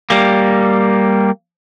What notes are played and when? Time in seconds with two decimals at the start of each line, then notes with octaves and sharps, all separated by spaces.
0.10 G3 A#3